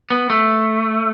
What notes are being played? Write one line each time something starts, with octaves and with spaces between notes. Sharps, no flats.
B3
A3